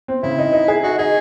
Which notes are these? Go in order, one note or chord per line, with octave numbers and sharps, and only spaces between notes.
C4
C#3 E4
D#4
D#4
G#4
D#4 F#4
D#4 G#4